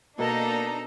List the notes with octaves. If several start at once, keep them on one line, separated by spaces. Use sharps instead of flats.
B2 A#3 D4 D#4 A4 A#4 A#5